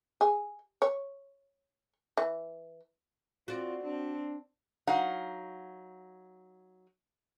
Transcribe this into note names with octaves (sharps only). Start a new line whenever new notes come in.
G#4
C#5
E3
C4 F4 F#4 D5
C4 D4
F#3 D#4 F5 F#5